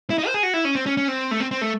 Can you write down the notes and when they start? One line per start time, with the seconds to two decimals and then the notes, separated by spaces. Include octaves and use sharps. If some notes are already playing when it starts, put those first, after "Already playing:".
0.10 E4
0.18 D#4
0.27 C5
0.34 G#4
0.43 F#4
0.54 E4
0.65 C#4
0.75 C4
0.86 C#4
0.97 C#4
1.08 C4
1.31 A3
1.40 C4
1.51 C4
1.61 A3